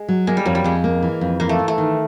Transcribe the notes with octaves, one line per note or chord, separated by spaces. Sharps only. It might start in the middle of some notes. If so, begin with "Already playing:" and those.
Already playing: G#3
F#3
G#3 A#3
G3
F2 F#3
G3
F2 G#3
A#3
E3
F2
E3 A#3
A3
E3
A3
D#3